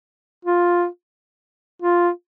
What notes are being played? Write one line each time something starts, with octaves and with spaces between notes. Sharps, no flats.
F4
F4